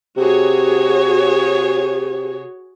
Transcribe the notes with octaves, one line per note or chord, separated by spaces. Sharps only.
C3 F#4 G#4 C#5